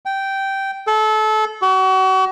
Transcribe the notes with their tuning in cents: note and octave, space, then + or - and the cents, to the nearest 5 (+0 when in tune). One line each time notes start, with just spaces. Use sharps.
G5 -10
A4 -25
F#4 +35